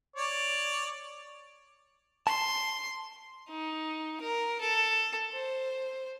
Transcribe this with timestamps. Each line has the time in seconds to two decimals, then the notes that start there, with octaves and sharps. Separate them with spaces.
0.16 C#5 D5
2.27 A5 C6
3.50 D#4
4.22 A#4
4.61 A4
5.33 C5